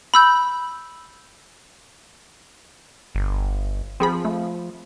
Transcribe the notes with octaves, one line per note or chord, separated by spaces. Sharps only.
B5 E6 G6
G1
F3 C4 G#4 B5
A3